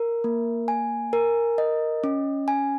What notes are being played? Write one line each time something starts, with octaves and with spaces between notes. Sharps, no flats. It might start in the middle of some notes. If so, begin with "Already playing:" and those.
Already playing: A#4
A#3
G#5
A#4
D#5
C#4
G#5